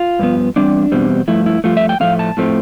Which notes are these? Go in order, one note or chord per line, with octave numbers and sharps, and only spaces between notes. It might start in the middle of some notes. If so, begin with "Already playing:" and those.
Already playing: F4
G2 F3 B3
E2 B2 G3 C4 D4
E2 B2 G3 C4
G2 F3 A3 E4
E4
G2 F3 A3 F4
E5
G5
A2 F3 A3 C4 F5
A5
A2 F3 A3 C4